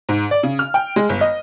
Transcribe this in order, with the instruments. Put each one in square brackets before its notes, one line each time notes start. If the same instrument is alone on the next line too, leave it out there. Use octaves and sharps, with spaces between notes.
[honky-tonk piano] G#2
D5
C#3
F6
G5
G#3
G1
D#5